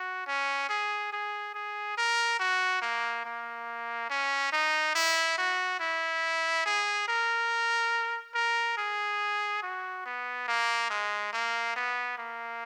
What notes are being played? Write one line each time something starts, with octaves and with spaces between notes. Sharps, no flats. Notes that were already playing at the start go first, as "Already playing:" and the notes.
Already playing: F#4
C#4
G#4
G#4
G#4
A#4
F#4
A#3
A#3
C#4
D#4
E4
F#4
E4
G#4
A#4
A#4
G#4
F#4
B3
A#3
G#3
A#3
B3
A#3